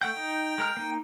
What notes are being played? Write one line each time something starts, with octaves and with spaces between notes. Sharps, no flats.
A3 F#5 G5 G6
D#4
G#3 A#4 F6
A#3 D#4